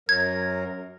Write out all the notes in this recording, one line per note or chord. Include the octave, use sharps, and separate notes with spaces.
F#2 F#3 A#4 G#6